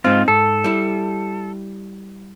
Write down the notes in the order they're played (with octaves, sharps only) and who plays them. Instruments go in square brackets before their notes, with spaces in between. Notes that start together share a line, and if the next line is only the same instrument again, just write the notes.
[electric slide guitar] G#2 F4 [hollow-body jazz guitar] C4 D#4 C5
[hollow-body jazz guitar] G#2 [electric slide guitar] A4
[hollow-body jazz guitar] G3 E4